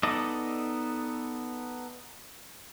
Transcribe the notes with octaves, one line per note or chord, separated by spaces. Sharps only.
B3 D#4 A4 D5 D#5